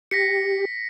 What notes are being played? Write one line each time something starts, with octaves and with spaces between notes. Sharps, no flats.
G4 A#6 B6 C#7